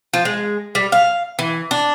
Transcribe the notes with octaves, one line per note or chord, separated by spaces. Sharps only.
F3
G#3
G3
F5
E3
D4